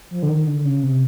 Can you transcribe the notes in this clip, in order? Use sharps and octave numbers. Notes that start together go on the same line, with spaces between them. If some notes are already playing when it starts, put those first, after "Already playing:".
F3
D3
D#3
D3
C#3
C3